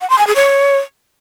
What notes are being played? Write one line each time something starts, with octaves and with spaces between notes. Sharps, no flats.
F#5
C6
G#5
G#4
C#5